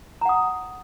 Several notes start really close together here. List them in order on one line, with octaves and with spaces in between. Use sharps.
A#5 F#5 D#6